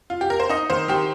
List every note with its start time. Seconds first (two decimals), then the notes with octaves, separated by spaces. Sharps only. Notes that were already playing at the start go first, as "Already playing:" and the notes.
0.10 F4
0.21 G4
0.30 A#4
0.40 C5
0.49 D#4 D#5
0.70 D#3 C5
0.88 D#3 G4